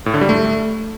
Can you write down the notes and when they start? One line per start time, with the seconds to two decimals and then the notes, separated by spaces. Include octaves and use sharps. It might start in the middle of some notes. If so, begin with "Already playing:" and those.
0.06 A2
0.14 D3
0.21 G3
0.29 A3